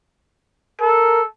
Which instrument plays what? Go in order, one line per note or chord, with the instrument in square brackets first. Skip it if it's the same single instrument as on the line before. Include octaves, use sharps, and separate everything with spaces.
[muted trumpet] A4 [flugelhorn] A#4